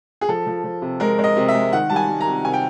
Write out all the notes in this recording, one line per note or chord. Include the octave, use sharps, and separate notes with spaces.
G#4
F3 A4
F3
F3
C3
G#3 A#4
G#3
D#5
C3
E5
G#3
D#3 F#5
G3 A5
G#5
G3
A#5
C3
C3 G#5
G5